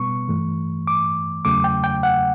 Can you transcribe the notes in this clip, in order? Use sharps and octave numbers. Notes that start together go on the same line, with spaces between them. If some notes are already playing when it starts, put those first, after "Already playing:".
Already playing: B2 G3 B3 C#6
G2 E3 A3
D6
E2 C#3 F#3 A3 D6
G5
G5
F#5